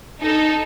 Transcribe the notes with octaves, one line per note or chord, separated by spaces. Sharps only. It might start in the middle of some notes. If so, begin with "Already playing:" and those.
D#4 A4